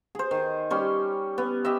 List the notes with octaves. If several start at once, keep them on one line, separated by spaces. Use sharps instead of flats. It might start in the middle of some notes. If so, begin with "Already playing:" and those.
G#4 C5
D#3
G3 C#4 C6
B3
G4 D#5 E5